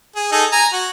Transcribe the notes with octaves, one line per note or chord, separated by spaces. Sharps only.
G#4
D#4 G#4 A4
G#5 A#5
F#4